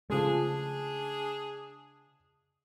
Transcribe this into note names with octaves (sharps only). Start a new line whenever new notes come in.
C#3 F3 G#3 A3 D4 G#4